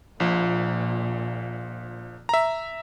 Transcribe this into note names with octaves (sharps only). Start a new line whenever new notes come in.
A#1 A#2 F3
E5 A#5